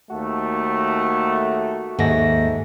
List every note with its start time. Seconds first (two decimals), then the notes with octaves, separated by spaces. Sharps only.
0.10 D#2 A3 F#4
1.99 D#2 G#2 A3 A#6